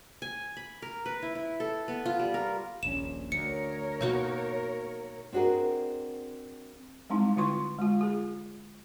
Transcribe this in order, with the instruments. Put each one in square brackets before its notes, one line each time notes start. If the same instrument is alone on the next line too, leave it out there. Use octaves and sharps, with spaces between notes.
[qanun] G#5
B5
A#4
B4
E4
E4
A4
B3
F4
G3
A#4
[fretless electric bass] D#1 A#1 C#4 [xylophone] E7
[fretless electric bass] D2 [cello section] A#4 C#5 [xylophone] C#7
[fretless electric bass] B2 [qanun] A#3 D#4 F#4
[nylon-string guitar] C4 D4 F#4 G#4 A#4
[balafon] G3 G#3 C4 D#4 E4
D3 E4 F4 C6 C#6
G#3 F4
F4 G#4